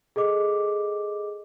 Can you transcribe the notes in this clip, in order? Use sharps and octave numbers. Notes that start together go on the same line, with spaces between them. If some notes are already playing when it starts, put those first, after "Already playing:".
G#4 A4 D#5 D6